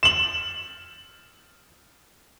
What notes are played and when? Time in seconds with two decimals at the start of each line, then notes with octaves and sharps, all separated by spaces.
0.03 E7 F#7